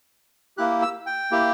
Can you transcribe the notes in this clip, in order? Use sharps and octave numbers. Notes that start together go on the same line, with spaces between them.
A#3 E4 G4 F#6
E6
G5
A#3 E4 G4